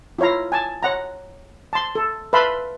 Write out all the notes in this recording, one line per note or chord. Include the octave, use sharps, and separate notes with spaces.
E4 F4 C#5 F5 A#5
G#5 A5
C#5 F#5 A#5
A5 C6
A4
B4 E5 F5 A5 B5 C6